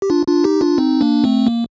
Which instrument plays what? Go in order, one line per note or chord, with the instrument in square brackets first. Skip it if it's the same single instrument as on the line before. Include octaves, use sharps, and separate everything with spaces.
[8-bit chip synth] G4
D4 F4
D4 F4
D#4 G4
D4 F4
C4 D#4
A#3 D4
A3 C4
A#3